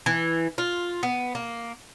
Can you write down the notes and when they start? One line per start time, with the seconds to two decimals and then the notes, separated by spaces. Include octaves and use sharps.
0.06 E3
0.58 F4
1.03 B3
1.35 A#3